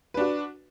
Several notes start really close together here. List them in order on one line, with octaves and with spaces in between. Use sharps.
B4 D4 F#4